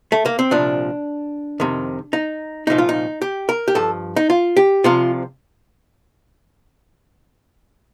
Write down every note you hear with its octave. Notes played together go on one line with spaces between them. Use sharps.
A3
A#3
C4
C2 A#2 F3 D4
F2 C3 D#3
D#4
C2 A#2 F3 D#4
F4
D#4
G4
A#4
G4
G2 F3 A4
D#4
F4
G4
C2 C3 F3 F4